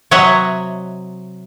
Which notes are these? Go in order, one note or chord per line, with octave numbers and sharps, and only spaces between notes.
C3 F#3 C#5 D#5 E5 F#5